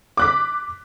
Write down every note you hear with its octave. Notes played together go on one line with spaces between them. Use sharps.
D6 F#6 B6